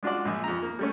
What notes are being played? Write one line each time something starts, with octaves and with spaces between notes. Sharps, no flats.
G#3 D4 F4 F#4 D5
A#1 G#3 G#4
F2 A#5
A#3
G3 A3 C#4